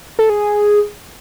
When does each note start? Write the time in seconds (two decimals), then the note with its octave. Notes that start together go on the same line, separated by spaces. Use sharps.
0.19 A4
0.30 G#4